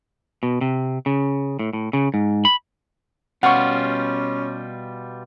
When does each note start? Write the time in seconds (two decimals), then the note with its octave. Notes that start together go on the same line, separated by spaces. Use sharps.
0.43 B2
0.61 C3
1.06 C#3
1.59 A2
1.73 A2
1.93 C#3
2.14 G#2
2.45 B5
3.43 B2 G3 C#4 F4 F#5 C#6